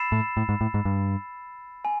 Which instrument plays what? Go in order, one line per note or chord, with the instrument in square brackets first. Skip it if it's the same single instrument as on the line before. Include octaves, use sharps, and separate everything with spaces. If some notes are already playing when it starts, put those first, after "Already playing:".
Already playing: [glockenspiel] B5 E6 A6 C7 E7
[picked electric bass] A2
A2
G#2
A2
G#2
G2
[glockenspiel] G#5